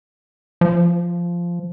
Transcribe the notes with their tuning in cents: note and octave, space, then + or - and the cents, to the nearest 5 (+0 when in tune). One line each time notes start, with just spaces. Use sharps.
F3 -10